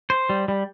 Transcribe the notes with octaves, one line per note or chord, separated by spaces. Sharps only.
C5
G3
G3